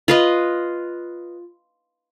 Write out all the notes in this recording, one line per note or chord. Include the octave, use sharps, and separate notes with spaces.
F4 B4 D#5